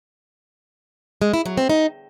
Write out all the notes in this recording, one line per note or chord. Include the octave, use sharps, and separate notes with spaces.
G#3
E4
F#3
C4
D#4